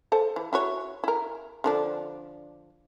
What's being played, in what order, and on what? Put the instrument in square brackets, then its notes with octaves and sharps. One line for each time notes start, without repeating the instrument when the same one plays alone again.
[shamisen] A4 C5 A5
E3
E4 F#4 C#5
E4 A#4
D3 F3 D4